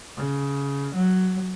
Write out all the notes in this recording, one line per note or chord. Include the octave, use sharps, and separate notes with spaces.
C#3
F#3